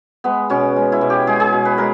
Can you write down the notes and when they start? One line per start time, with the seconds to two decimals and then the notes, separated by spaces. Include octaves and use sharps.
0.24 G#3 B3
0.50 B2 C#4
0.76 G#3
0.92 E4
1.01 B2
1.10 G4
1.27 G#3 G#4
1.40 G#4
1.52 B2
1.65 B4
1.78 G#3 A#4